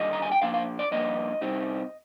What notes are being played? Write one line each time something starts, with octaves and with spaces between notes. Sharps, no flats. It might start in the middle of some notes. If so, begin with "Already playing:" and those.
Already playing: D#2 D3 G3 D#5
A#5
G#5
G5
A#2 F3 A#3 D4 F5
F5
D5
G2 F3 A#3 D4 D#5
C2 C3 G3 C4 D#4